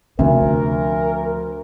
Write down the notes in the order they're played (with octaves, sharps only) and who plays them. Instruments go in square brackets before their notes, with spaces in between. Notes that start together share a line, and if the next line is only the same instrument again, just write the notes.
[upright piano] D2 [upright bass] C3 F3 [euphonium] A#4